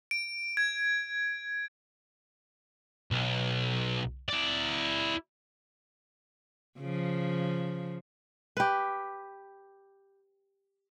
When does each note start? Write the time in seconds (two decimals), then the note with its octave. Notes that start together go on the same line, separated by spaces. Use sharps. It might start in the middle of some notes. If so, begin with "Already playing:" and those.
0.11 D7
0.57 G#6
3.11 B1
4.29 E4 D5
6.79 C#3 F3
8.57 G4 B4